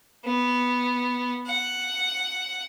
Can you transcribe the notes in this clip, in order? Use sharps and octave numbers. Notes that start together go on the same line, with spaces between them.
B3
F#5